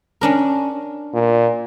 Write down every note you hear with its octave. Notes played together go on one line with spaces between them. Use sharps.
C#4 D4 A#4
A#2